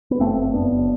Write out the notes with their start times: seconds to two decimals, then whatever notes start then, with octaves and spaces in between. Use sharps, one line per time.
0.11 B3
0.19 F#1 A3 C4
0.37 F#1
0.54 F#1 B3 D4
0.71 F#1